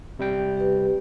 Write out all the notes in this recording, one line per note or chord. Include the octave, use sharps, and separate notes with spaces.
C3 G3 G5
G4 B4